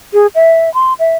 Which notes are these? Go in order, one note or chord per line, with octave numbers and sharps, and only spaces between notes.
G#4
E5
C6
E5